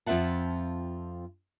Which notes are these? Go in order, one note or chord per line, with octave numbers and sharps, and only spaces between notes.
F2 C4 F4 E5 F#5 A5